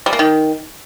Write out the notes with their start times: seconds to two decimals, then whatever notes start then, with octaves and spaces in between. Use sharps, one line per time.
0.06 G3
0.13 A#3
0.19 D#3